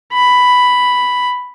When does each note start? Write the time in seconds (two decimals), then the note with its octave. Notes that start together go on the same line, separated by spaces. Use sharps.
0.13 B5